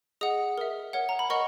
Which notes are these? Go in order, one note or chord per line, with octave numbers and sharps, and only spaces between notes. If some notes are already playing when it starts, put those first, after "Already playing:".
G#4 D#5 F#5 D#6
A#4 E5
A#4 C#5 F#5
A#5
B5
A#4 D#5 F#5 C#6